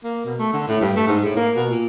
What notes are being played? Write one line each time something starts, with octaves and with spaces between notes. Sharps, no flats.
A#3
B2
A3
D3
A2
G2
A3
G#2
A2
A#3
B2
A#2